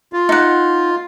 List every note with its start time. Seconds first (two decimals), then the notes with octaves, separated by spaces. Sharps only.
0.13 F4
0.29 D#4 F#5